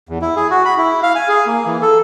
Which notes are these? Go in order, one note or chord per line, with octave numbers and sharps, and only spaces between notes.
E2
E4
G#4
F#4
B5
E4
F5
G#5
G#4
A#3
E3
A4